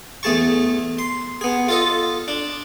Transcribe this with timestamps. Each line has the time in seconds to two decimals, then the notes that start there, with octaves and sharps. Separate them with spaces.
0.23 E2 A3 G#4 A5 C#6
0.99 C6
1.41 B3 G#4
1.69 F4 A4 D#5
2.28 D4